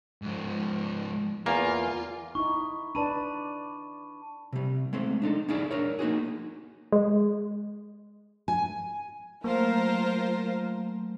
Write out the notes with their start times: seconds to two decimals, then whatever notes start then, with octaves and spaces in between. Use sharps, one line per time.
0.22 G#2 F3
1.46 E2 A#3 F4 G#5
2.35 D#4 E4 C#6
2.95 D4 B4 D5 A5 B5 D#7
4.53 C3 G3
4.93 G#3 A3 C4
5.22 D4 D#4 A4
5.49 C#4 D#4 E4 G#4 D5
5.71 D4 A#4 C#5
5.99 A#3 D#4 F#4 G#4
6.93 G#3
8.48 G#5
9.44 F#3 A3 A#3 F4 A#4 C5